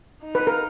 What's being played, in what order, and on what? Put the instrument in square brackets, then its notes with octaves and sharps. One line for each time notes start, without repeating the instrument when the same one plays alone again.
[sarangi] D#4
[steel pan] B4
A#4